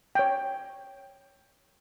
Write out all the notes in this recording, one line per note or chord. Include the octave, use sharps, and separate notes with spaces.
C#5 G5